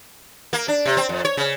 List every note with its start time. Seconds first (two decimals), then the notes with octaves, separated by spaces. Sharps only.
0.53 A#3
0.68 D4
0.86 C3
0.97 C4
1.09 F2
1.25 C#5
1.37 C#3